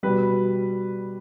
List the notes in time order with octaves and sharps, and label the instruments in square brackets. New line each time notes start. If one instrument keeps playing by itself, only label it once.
[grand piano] B2 G3 B4